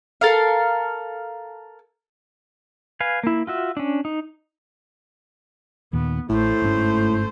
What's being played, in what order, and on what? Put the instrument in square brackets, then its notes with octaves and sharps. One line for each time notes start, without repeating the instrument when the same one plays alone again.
[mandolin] A4 A#4 F5
[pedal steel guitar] B4 F5 G#5
A#3 E4
F4 F#4 E5
C#4 D4
D#4
[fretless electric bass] D#2 A#2 D#3 [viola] B3
[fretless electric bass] A1 [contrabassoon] A2 [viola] A3 C5
[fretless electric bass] G1 G#2 C#4